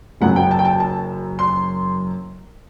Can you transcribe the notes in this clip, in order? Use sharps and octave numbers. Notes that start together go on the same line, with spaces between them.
F#1 F#2 F#3 F#5
G5
A5
G5
A5
A5
C6